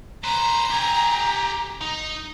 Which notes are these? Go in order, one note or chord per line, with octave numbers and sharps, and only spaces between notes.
B4 C5 A#5
G4 G#5
D#4